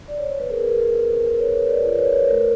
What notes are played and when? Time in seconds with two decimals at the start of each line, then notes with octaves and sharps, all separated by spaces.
0.08 D5
0.18 C#5
0.29 C5
0.40 B4
0.49 C4 G#4 A#4
0.94 C4 A#4 C5
1.39 C4 B4 C#5
1.69 C5 D5
1.83 F4
1.98 B4 C#5
2.28 A3 A#4 C5